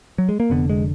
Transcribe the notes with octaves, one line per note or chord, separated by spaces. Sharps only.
F#3
G#3
A#3
F1 F2 D3 B3
G#3